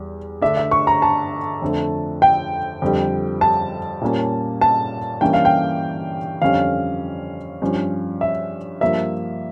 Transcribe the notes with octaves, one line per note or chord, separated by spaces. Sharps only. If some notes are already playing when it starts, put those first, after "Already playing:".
Already playing: E2 G3
D3 A3 D4 E5
E5
C#6
A#5
A5
F2 D3 A3
G5
F2 D3 G3
A5
A#2 G3 A#3 C#4
A5
G2 E3 A#3 C#4 G5
F5
G5
F2 D3 G3 C#4 F5
G2 F3 C#4
E5
G2 F3 A#3 E5